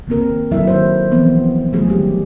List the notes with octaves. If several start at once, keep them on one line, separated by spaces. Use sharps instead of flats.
D#3 A#3 C4 A#4
D#3 F#3 E4 A4 E5
C5
E3 F3 B3 C4
D#3 F#3 G3 A3 F4 G#4
G3 G#3 G4